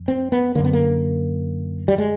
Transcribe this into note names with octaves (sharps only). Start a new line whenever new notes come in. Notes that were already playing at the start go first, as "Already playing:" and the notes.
Already playing: F2
C4
B3
F#2 D3 A#3
B3
A#3
G3
G#3